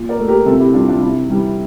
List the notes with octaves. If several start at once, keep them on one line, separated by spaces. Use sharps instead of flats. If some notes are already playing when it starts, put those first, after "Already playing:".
Already playing: A#2
A#4 D5
A3
G4 A#4
C3 F4 A4
E4 G4
G3 D4 F4
D4 F4
C3 E4
E3 G3